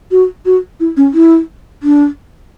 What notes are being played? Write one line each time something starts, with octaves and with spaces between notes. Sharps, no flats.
F#4
F#4
E4
C#4
E4
D4